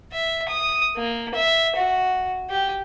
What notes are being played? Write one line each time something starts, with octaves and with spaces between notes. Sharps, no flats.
E5
D#6
A#3
E5
F#4
G4